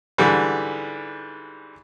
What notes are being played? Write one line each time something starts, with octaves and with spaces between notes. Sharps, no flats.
G#2 D3 E3 G3